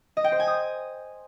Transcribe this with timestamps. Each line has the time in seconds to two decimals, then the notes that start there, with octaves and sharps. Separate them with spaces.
0.17 D#5
0.24 G5
0.32 C5
0.40 G#5
0.47 D#6